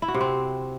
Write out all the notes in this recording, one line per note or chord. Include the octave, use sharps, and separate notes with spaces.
E4
F#4
C3
C4